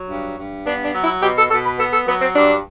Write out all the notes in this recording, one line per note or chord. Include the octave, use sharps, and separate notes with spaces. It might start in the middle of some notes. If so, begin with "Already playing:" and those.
Already playing: F#3
G2
G2
B3 D4
D4
F#3
E4
B2 G4
A4
B2 A4
B4
B3 A4
A4
F#3 B3
C4
G2 D4